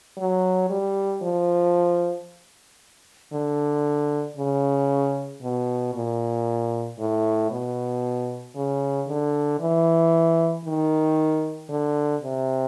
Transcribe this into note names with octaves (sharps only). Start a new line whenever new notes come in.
F#3
G3
F3
D3
C#3
B2
A#2
A2
B2
C#3
D3
E3
D#3
D3
C3